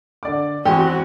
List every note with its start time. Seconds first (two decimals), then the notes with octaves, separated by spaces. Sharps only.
0.23 D3 D5 D6
0.65 E2 G#3 C4 F#4 G4